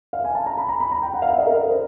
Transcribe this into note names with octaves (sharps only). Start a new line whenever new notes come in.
F5
G#5
A5
A#5
B5
A#5
B5
A#5
G5
F#5
F5
E5
D#5
A#4
A#4
C5